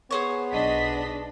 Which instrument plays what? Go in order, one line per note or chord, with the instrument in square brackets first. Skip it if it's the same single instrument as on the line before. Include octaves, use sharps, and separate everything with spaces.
[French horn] B3 [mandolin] G#4 C5 C#5
[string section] B1 D#5 B6 [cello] D4